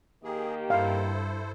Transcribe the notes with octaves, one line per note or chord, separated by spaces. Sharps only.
D#3 A#3 G4 G#4
G2 E4 A4 C5 F5